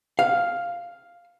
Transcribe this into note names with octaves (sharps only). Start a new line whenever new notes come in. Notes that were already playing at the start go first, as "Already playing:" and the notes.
F5